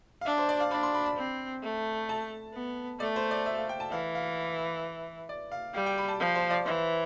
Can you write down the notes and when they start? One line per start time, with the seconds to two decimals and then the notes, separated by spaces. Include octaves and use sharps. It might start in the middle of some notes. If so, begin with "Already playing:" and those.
0.21 F5
0.25 D4 E5
0.38 C5
0.49 D5
0.60 F5
0.71 D4 B5
0.83 C6
0.95 B5
1.06 B5
1.17 C4
1.63 A3
2.09 A5
2.55 B3
3.00 A3 D5
3.16 C5
3.31 D5
3.46 E5
3.57 F5
3.69 G5
3.80 A5
3.91 E3 F5
4.15 F5
5.29 D5
5.52 F5
5.75 G3 F5
5.86 G5
5.98 B5
6.08 A5
6.20 F3
6.35 C5
6.51 D5
6.66 E3 C5